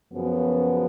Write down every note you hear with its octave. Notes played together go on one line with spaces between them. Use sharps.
F#2 C#3 F3 B3